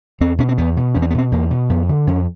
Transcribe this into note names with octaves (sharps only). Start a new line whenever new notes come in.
E2 C4
B2 C#4
C4
E2 B3
B2
E2 C#4
C4
B3
B2 C4
E2 A#3
B2
F2 B3
D3
F2 C#4